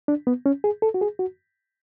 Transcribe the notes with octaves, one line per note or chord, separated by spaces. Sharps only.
D4
B3
C#4
G#4
A4
F#4
G#4
F#4